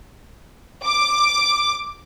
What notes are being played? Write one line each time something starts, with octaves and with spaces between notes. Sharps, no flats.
D6